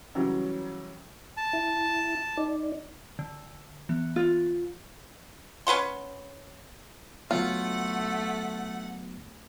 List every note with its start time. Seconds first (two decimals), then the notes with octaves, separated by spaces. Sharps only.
0.15 C#3 E3 F#3 G3 C#4
1.37 A5
1.53 E4
2.37 D#4 D5
3.19 D3
3.89 E3 B3
4.16 F4
5.67 C#4 B4 F#5 C6
7.31 D3 F#3 A3 B3 F4 F#5